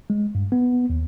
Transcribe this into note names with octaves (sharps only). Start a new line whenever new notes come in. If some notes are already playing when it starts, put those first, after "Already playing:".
G#3
G2
B3
D#2